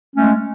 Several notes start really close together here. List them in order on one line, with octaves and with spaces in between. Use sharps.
C#4 A3 G#3